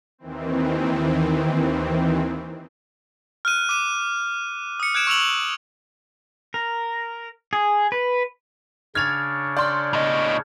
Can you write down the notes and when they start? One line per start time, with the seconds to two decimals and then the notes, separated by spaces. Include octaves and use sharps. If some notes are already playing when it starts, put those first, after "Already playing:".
0.19 D#2 D#3 E3 C4
3.45 F6 F#6 D#7
3.69 D6 D#7
4.80 D#6 C#7
4.95 F#6 G#6 D7 E7
5.07 C#6 E6 F7 F#7
6.54 A#4
7.53 G#4
7.92 B4
8.95 C#3 D4 C#5 F6 G#6 A6 F7
9.57 D5 C6 F6 G6
9.93 A2 D#5